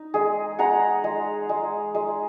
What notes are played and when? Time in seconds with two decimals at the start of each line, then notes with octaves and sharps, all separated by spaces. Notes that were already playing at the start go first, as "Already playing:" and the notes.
Already playing: D#4
0.14 G#3 G#4
0.59 G#3 F#5 A#5
1.04 G#3
1.49 G#3
1.95 G#3